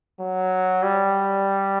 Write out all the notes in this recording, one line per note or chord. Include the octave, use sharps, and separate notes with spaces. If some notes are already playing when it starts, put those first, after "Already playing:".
F#3
G3